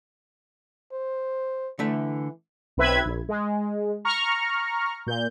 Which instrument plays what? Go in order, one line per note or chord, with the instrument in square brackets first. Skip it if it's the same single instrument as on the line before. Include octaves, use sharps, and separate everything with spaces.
[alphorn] C5
[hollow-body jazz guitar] D3 A3 E5 [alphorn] E3
[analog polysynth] B1 C4 B4 E5 B5 G#6
A#1
G#3
A#5 C#6 F6
A#2 G6